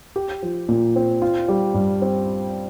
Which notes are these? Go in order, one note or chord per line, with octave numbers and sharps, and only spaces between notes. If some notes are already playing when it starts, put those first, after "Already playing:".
G4
F3
A#2
C4
F4
G3
G2
C4